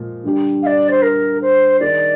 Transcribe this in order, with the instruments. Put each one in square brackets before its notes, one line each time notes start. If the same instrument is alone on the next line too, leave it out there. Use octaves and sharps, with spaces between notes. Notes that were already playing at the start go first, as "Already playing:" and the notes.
Already playing: [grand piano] A#2 F3 G#3
D3 G3 D4 G4
[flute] F5
D5
C5
A#4
C5
[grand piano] D#3 A#3 D#4 G#4 [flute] D5